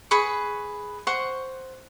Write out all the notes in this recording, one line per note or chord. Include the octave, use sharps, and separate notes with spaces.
G#4 B4 B5 C#6
C5 F#5 C#6